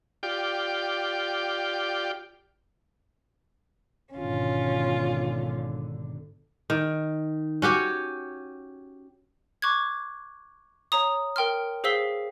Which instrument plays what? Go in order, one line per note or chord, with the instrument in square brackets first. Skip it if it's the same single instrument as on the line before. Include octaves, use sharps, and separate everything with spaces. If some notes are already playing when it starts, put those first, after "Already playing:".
[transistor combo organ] F4 G4 D5 G5
[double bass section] G#1 B2 D3 [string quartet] C#4 F4
[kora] D#3
C#4 F#4 G4 C#5
[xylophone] C#6 D6 F#6 G#6
C#5 A#5 D#6
A#4 G5 C6 F6
G#4 C5 F5 E6 B6 G7